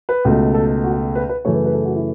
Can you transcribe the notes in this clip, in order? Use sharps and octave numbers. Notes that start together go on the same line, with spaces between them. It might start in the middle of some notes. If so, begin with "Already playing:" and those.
B4
C#2 B2 A3
A4
F#4
B4
B4
F#2 C#3 E3 A3 C#5
B4
B4
A4
F#4
E4